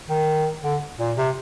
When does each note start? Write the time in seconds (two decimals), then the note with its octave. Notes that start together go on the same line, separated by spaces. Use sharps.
0.09 D#3
0.63 D3
0.99 A#2
1.17 C3